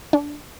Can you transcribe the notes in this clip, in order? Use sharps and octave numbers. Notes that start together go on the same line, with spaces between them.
D4